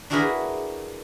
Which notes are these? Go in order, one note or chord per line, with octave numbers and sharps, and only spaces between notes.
D4 E4 F#4 G#4 A#4 B4